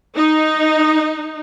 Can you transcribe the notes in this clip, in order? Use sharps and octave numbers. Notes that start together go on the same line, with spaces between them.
D#4